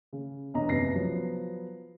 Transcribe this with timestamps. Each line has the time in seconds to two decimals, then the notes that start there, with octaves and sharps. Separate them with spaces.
0.13 C#3
0.54 E1 E2 C#4 D4 D#5 A#5
0.68 F#1 C2 B4 A#6 C7
0.95 F3 F#3 B3